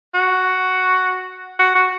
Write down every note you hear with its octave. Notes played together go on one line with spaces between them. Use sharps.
F#4
F#4
F#4